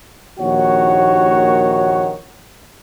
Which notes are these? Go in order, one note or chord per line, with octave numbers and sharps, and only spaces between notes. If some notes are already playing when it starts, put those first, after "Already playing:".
A#1 D#2 D#3 F#4 C#5 F#5